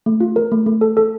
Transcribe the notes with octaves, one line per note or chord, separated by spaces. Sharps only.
A3
F4
A#4
A3
A3
A4
A4